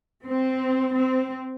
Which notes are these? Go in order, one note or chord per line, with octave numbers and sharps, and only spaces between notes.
C4
C4